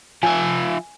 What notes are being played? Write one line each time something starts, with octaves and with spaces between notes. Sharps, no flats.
F3 E5 G#5